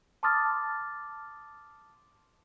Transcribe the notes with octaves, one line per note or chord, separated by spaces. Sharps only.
A5 C6 D6 D#6 F6 A6